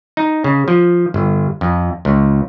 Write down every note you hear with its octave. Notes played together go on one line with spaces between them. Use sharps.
D#4
C#3
F3
G1
F2
C#2